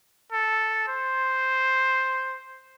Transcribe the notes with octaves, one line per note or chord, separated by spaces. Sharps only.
A4
C5